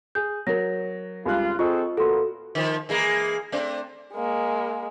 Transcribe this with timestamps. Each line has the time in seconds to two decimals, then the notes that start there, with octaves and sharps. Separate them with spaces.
0.15 G#4 G6
0.47 F#3 A#4 A#6
1.26 G#1 C#2 G3 F4 F#6
1.59 C4 F4 G#4 A4 D#5 C#6
1.97 A#2 A#3 B3 F#4 A4 C6
2.55 D#3 F3
2.89 E3 G#3 A#3
3.52 A3 C4 D4
4.15 G#3 A#3